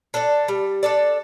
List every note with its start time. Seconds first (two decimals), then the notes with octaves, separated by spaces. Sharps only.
0.14 D4 A4 D5
0.48 G3
0.83 D4 A4 D5